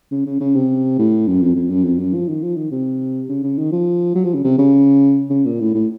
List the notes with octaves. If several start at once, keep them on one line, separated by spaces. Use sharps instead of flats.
C#3
C#3
C#3
C3
A2
F#2
F2
F2
F#2
F2
F#2
F3
D#3
F3
D#3
C3
C#3
C#3
D#3
F3
F#3
F3
C#3
C3
C#3
C#3
A#2
A2
A2